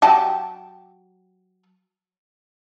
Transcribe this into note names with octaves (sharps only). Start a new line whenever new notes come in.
F#3 G4 A5